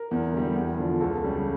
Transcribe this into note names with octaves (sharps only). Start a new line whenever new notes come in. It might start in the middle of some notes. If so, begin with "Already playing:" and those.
Already playing: A#4
E2
D3 G3
E2
D3 F3
C#2 A4
C#3 G3